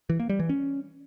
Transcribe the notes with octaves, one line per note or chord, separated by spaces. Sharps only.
E3
A#3
G3
E3
C#4